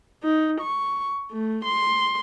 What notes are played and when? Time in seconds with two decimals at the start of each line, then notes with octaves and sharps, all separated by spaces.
0.23 D#4
0.61 C#6
1.32 A3
1.65 C6